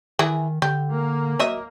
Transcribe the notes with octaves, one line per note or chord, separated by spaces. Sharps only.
D#3 E3 E4 G#4
D3 G4
A#3
F#3 D#5 E5